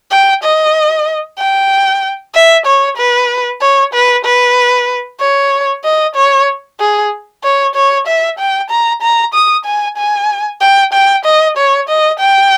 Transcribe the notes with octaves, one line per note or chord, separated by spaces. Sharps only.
G5
D#5
G5
E5
C#5
B4
C#5
B4
B4
C#5
D#5
C#5
G#4
C#5
C#5
E5
G5
A#5
A#5
D#6
G#5
G#5
G5
G5
D#5
C#5
D#5
G5